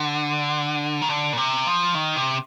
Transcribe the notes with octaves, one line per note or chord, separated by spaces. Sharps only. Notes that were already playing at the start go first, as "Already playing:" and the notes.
Already playing: D3
D#3
D3
A#2
C3
F3
D#3
C3